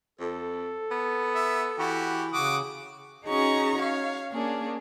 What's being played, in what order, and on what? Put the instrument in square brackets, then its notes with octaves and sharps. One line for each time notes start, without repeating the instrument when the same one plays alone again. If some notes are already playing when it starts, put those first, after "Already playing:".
[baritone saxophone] F2 [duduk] A4
[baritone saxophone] B3
[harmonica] E5
[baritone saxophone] E3 [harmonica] F#4 G4
[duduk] C#3 [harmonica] F#4 D6 D#6
[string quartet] C#4 D#4 F#4 G#4 A#5 C#6
C#5 F5
A#3 C#4 D4 G#4